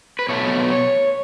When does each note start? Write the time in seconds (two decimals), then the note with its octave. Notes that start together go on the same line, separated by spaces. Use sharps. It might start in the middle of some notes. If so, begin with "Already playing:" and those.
0.19 B4
0.29 B2 F#3 A3 C#5